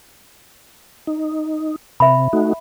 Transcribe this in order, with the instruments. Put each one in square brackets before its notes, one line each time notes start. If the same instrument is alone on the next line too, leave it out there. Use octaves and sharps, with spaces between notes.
[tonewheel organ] D#4
[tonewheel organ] C3 [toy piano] E5 B5
[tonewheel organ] A3 D#4 F#4